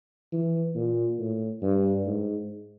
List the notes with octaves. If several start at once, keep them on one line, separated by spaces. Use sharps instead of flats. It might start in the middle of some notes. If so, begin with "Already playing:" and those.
E3
A#2
A2
G2
G#2